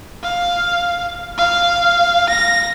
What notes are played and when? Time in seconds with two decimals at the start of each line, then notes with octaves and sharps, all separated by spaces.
0.23 F5
1.38 F5
2.29 A#6